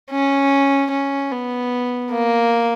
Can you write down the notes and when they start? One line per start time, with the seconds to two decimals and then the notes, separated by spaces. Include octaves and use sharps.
0.11 C#4
0.91 C#4
1.32 B3
2.12 A#3